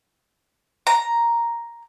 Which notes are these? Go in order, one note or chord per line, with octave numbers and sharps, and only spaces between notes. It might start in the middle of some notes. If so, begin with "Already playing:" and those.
A#5